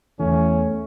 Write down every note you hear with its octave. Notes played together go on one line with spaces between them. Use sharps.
E2 E3 A3 C#4